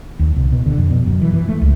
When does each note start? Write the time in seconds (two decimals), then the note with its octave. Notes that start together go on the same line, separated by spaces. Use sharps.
0.19 D#2
0.36 C2
0.52 B2
0.66 D3
0.78 F2
0.91 B2
1.07 F#2
1.22 E3
1.34 E3
1.49 A3
1.62 C#2